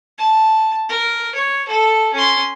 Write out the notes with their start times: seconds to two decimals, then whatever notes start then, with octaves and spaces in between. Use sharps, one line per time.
0.18 A5
0.89 A#4
1.35 C#5
1.68 A4
2.14 C#4 C6